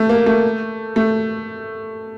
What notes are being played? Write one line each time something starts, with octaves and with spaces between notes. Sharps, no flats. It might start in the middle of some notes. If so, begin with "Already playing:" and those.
Already playing: A3
A#3
A3
A3